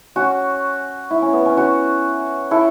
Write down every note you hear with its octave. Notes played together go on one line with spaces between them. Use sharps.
C#4 F#4
E4
C#4
B3
C#4
C#4 F#4
E4 A4